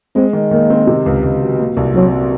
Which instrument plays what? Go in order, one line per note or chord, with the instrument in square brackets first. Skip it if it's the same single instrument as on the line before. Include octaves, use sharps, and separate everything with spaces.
[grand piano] G#3 [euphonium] C4
[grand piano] D#3
[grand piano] D#3 [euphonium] A#3
[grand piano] C4
C3
C#2
C#2
F#3
A#2
C2
[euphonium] F#3 [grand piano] C4
[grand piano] F#3